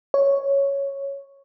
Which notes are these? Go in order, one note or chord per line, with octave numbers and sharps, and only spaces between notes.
C#5